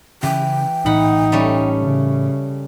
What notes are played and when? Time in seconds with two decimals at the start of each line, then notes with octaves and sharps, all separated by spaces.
0.23 C#3 E3 C#4 G5
0.86 A2 E3 D#4 F#5 B5
1.32 G3 A3 C#4
1.81 C#3